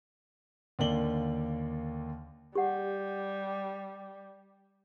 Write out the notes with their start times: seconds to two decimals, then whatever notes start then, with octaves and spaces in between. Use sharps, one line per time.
0.79 D#2 D3 A#3 D5 F#7 G7
2.55 G3 G4 F#5